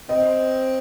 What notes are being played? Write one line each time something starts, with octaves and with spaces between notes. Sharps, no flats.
C4 D#5